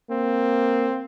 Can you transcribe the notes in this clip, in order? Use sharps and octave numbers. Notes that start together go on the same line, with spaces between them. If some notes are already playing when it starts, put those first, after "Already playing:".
A#3 C4